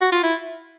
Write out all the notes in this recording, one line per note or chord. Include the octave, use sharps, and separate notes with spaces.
F#4
F4
E4